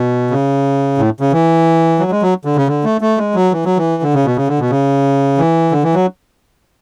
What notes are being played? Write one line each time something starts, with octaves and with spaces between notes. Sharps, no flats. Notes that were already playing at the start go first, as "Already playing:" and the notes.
Already playing: B2
C#3
A2
C#3
E3
F#3
G#3
F#3
D3
C#3
D3
A3
A3
G#3
F#3
E3
F#3
E3
D3
C#3
B2
C#3
D3
B2
C#3
E3
D3
E3
F#3